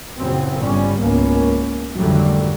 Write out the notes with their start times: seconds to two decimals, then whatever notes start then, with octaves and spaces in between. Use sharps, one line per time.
0.18 F#1 F#2 A#2 C#3 F#3 C4
0.59 G1 G3 C#4
0.99 G#1 C#2 A#3 B3 C#4
1.96 G#1 F2 D3 F#3 G3 A3